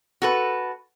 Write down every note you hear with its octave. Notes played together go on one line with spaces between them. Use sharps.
F#4 A4 B4